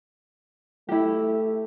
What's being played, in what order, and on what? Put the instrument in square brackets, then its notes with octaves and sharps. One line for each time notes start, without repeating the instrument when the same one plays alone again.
[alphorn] A3 [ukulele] E4 G4